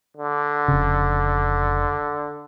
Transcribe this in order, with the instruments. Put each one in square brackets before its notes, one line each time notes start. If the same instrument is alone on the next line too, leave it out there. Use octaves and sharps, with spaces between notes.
[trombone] D3
[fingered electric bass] F1 C#3